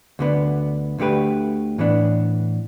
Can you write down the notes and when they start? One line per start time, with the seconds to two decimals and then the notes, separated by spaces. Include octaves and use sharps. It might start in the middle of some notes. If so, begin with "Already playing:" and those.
0.19 D2 D3 B3
0.98 D2 D3 A3 G4 B4
1.78 A2 E3 B3 D4